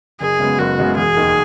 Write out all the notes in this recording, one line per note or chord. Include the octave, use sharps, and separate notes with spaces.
F#1 G#4
F#2 C#3 G#3 B3
F#1 F#4
F#2 C#3 G#3 B3
E1 G#4
D#2 D#3